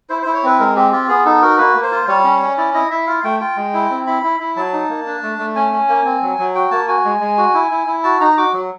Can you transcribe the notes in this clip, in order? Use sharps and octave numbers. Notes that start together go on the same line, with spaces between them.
E4 C5
E4 C5
C#5
C4 B4
G#3 A#4
C4 G4
F4 G4
B3 G#4
D#4 A4
F#4 A#4
A#3 B4
A#3
C5
F4
G3 C#5
C#4
C#4
E4 D5
E4 D#5
E4 E5
F4 F5
A3 G5
F4 G5
G#3
E4
C4
E4 B5
E4
E4
F#3 A5
D#4
A#3
D4
A3
A3
C#4 G#5
C#4
A#3
C4
F#3
F#3
F#4 G5
A#3 A5
F#4 G#5
G#3
G#3
F#4
E4
E4
E4
F#4 A5
D#4 A#5
F#4 D6
F#3